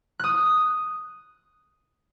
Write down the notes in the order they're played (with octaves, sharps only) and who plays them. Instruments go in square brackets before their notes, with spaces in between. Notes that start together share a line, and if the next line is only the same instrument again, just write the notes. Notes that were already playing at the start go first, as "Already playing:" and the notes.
[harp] D#6 F#6